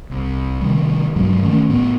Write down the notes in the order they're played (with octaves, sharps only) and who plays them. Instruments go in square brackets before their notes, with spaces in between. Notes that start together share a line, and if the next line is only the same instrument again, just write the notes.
[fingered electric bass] C2
C3 D#3 G3
G2 B2 F#3 G#3
D#3 E3 A3 C#4
A2 B3